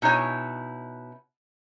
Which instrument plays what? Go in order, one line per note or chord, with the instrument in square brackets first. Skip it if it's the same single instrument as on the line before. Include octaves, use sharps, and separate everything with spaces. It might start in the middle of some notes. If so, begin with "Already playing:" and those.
[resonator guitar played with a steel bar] B2 D#4 E4 C#5 G#5